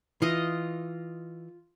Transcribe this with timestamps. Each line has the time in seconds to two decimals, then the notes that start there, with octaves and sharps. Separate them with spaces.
0.22 E3 F4 D#5